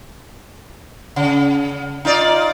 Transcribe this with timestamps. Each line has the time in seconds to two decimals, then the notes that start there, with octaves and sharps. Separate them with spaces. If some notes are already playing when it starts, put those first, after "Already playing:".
1.16 C#3
2.05 D#4 F4 D5